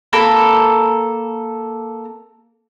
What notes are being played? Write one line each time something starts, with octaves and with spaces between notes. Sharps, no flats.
A#3 A4 A#4 B5